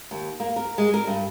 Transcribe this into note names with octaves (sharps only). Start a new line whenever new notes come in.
D#2
A#3
A#4
G#3
A#4
G2